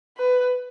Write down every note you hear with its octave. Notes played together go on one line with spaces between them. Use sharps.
B4